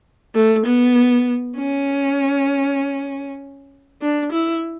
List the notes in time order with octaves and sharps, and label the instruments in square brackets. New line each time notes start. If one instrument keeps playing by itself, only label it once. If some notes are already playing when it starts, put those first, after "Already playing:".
[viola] A3
B3
C#4
D4
E4